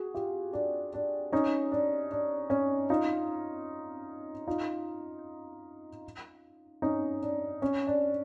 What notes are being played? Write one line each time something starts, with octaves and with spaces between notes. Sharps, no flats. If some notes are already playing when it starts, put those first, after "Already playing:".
Already playing: F#4 G#4
F4 G4
D4
D4
C#4 D#4
D4
D4
C#4
D#4 F4
D#4 F4
C#4 D#4
D4
C#4
D4